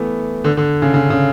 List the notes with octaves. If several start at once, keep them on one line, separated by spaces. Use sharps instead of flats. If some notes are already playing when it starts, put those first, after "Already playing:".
Already playing: E3 A3 B3
D3
D3
C#3
C#3
C#3